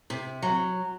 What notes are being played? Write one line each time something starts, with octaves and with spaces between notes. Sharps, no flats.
C3
F#3